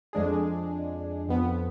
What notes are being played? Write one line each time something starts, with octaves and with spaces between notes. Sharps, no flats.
F2 F3 G#3 D4 G#4
F2 F3 B3